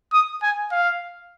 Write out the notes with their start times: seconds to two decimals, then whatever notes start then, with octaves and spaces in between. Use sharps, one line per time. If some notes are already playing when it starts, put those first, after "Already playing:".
0.13 D#6
0.42 G#5
0.72 F5